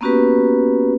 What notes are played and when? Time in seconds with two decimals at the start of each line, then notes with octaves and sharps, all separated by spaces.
0.01 A#3 B3 C#4 F#4 G4 B4